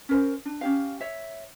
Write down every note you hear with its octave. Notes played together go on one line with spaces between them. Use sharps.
C#4 A#4 C5
D4
C#4 G4 F5
C#5 E5